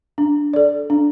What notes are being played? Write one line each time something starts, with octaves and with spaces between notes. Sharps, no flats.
D4
A4 D5
D4